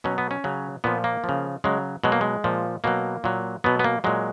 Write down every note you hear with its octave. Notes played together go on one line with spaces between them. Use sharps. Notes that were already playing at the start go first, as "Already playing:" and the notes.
B2 F#3 C#4
B3
C#4
C#3 F#3
A#2 F3 B3
A#3
C#3 F3
C#3 F#3 G#3
B2 F#3 G#3
A#3
G#3
A#2 F3
B2 F#3 A#3
A#2 F#3
B2 F#3 B3
B3
A#3
A#2 F#3 G#3